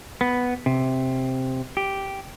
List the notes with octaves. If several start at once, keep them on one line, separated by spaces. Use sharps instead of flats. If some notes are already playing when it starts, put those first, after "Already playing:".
B3
C3
G4